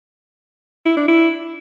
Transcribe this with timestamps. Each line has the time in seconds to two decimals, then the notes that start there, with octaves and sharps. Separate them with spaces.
0.86 E4
0.97 D4
1.08 E4